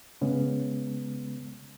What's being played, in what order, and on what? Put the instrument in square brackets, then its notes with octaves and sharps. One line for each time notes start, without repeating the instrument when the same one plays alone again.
[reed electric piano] C#3 G#3 B3 C#4